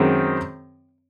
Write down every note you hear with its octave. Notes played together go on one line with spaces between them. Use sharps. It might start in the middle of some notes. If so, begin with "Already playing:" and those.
Already playing: F#2 D#3 G#3 C4